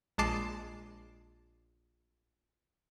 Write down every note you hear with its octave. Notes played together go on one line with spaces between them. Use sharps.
A#1 G#3 A5 D6 C7